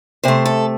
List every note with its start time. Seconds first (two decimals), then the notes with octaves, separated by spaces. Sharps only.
0.24 C3 A3 C5
0.46 A4